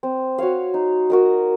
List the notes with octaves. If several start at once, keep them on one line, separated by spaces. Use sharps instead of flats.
C4
F#4 C#5 F5
D#4
F#4 A#4 D#5